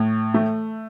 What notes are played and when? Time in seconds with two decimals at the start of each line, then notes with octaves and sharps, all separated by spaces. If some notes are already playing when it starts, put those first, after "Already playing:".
Already playing: A2
0.34 A3